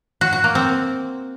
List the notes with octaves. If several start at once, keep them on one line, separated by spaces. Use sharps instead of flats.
F#4
F#4
A#3
C4